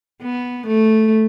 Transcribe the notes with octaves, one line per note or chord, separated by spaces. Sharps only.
B3
A3